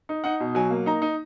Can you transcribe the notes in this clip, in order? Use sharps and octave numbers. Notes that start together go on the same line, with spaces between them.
D#4
D#4 F#5
B2
F#3 G#5
A#3
D#4 A#5
D#4